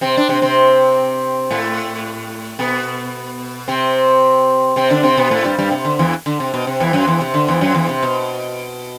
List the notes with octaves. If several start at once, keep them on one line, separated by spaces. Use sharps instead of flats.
C3 C4
D4
C3 C4
C3 C4
A2 A3
B2 B3
C3 C4
C3 C4
D3 D4
C3 C4
B2 B3
A2 A3
G2 G3
G2 G3
C3
D3
E2 E3
D3
C3
B2
C3
E2 E3
F#2 F#3
E2 E3
C3
D3
E2 E3
F#2 F#3
E2 E3
C3
B2